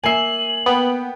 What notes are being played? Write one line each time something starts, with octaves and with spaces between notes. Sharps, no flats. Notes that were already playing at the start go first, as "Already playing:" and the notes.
A#3 E5 G#5 C7 F#7
B3 G5